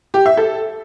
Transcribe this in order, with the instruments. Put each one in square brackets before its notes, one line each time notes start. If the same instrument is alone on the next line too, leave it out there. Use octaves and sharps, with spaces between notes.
[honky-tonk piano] G4
E5
A4